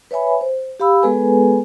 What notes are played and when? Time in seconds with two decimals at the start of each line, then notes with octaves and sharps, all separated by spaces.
0.11 B4 C#5 E5 G#5 B5
0.41 C5
0.80 G4 F5 B5 E6
1.03 G#3 B3 G#4 A4 B4 G#5